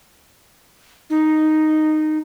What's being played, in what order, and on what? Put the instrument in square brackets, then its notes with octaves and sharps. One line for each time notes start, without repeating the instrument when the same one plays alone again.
[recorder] D#4